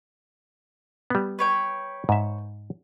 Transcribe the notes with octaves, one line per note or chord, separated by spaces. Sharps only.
G3 B3
B4 C#5 G5
G#2 E5